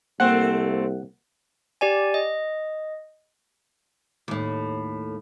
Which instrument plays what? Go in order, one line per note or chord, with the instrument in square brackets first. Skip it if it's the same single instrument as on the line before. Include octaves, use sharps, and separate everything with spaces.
[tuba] C2 [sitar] A3 C4 [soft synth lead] A#3 [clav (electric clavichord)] F#5
[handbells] G4 D5 G#5
D#5
[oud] D#2 A2